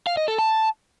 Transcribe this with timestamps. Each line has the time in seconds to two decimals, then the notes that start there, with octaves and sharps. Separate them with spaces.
0.07 F5
0.17 D#5
0.28 A4
0.39 A5